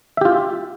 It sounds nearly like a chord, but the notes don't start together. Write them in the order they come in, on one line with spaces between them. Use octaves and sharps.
E5 G4 F4